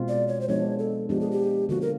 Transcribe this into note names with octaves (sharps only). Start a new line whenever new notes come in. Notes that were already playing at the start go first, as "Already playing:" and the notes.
Already playing: B2 G#3 C4 F4
D5
C#5
C5
F3 G#3 B3 D4 C#5
A4
F3 G#3 B3 D4 G4
G#4
G4
D3 F3 A#3 F#4
A#4